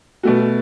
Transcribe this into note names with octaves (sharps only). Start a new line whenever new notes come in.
B2 A3 F#4